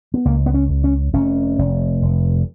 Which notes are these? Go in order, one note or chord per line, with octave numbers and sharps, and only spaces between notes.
B3
C#2 A#3
B3
C#4
C#2
C#4
F1 C#4
F1
F1